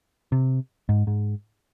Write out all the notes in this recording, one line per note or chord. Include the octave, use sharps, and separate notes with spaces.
C3
G#2
G#2